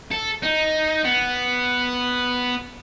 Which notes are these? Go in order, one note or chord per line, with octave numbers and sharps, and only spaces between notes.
A4
D#4
B3